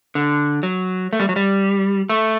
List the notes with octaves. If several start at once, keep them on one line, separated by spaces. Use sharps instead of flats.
D3
F#3
A3
G3
F#3
G3
A3